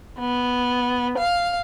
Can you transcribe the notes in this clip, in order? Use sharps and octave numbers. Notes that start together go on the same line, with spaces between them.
B3
F5